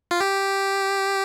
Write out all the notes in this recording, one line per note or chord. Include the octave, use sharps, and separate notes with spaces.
F4
G4